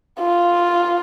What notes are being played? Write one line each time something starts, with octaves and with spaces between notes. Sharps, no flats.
F4